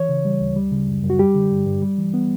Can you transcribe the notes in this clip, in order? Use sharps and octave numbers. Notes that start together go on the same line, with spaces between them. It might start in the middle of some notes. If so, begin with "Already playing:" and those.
Already playing: E3 C#5
C#3
G3
D2
G3
C#3
F#2
F#2
F#4
G3 G4
D3
G2
G2
G3
E3
B3